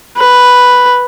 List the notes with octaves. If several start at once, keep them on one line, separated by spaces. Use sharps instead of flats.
B4